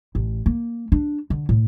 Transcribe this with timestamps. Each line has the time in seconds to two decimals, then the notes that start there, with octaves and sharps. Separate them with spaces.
0.15 A1
0.46 A#3
0.92 D4
1.30 D3
1.49 A2